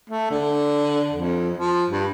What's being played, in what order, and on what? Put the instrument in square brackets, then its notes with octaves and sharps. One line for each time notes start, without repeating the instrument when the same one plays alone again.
[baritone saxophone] A3
D3
F2
F3
G2